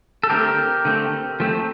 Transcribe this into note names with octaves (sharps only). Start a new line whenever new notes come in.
A4
D3 A3 C4 G4 A#4
D3 A3 C4
F3 A3 C4